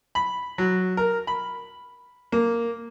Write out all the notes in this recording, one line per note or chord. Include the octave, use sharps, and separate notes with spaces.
B5
F#3
A#4
B5
A#3